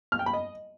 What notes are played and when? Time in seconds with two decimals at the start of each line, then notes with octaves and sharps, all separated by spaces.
0.12 F6
0.19 G5
0.26 B5
0.34 D#5